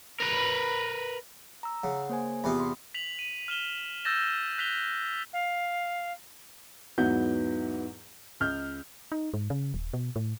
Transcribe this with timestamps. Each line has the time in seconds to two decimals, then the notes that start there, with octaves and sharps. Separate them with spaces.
0.20 A#4 B4
1.63 A#5 E6
1.84 C#3 F#5
2.09 A#3 C5 G#5
2.44 E2 C3 F4 B5 D#6
2.60 C6
2.94 B6 F7 F#7
3.19 D#7
3.48 F6 E7 G7
4.05 E6 G6 A6 A#6 E7
4.58 F#6 B6 F7 G7
5.33 F5
6.98 E2 G#2 F#3 B3 F#5 G6
8.40 C#2 F6 G6
9.12 D#4
9.34 G#2
9.50 C#3
9.74 D#1
9.93 B2
10.16 A2